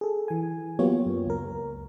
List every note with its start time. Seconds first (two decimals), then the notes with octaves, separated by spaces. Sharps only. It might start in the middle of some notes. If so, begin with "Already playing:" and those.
0.01 G#4 A4
0.28 E3 G#5
0.79 F#3 A#3 B3 F4 G4 C#5
1.06 F#2
1.26 C#2 A#4